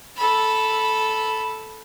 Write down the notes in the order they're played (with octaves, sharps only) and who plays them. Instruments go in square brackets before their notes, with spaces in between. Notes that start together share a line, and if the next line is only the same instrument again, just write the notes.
[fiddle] A4 B5